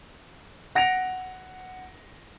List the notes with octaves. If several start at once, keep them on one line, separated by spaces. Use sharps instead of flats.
F#5 A#6 D7 F7